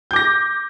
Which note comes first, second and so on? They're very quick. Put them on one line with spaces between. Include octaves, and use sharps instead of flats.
G6 D6 A#6